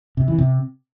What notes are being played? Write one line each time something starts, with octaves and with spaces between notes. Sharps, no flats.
C3
E3
C3